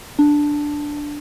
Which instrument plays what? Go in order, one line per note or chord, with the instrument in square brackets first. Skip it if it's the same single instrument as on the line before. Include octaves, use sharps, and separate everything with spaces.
[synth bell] D4